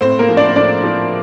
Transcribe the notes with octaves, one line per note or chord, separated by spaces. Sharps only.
A2 C4 C5
A#3 A#4
F3
D4 D5
A2 D4 D5
F3